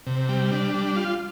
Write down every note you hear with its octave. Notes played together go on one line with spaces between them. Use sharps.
C3
G3
D4
G3
F4